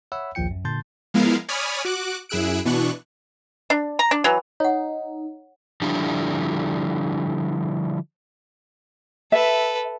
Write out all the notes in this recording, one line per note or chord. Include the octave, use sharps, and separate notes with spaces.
C#5 E5 F#5 B5 E6
A#1 D#2 F3 F4 G5 C#7
F#2
A#2 D3 A5 C6 G6 A6
F3 G#3 B3 E4 A#4 F5
C#5 D5 G#5 B5 D#6 F6
F#4 D6 F#6
F#2 E4 G#4 E6 F#6 D7
B2 E3 B3 D4 C#6 F#6
D4
A#5
D4
E3 F#3
D#4 C#5 F#5
D3 F3 G3 D4 E4
A4 B4 E5